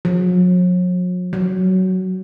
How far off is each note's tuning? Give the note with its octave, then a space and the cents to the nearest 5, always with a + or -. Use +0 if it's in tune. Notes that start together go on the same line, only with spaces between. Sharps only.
F#3 -45
F#3 +10